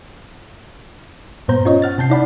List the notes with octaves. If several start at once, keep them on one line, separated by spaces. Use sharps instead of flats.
G2 A#2 B3 C5 A#5 G6
C#4 F4 C#5 D#5
F#5 F6 A6
C3 A5 G6 C7
D#4 E4 D5 F#5 B5